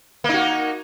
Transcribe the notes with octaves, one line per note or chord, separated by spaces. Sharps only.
A#3 D#4 F#4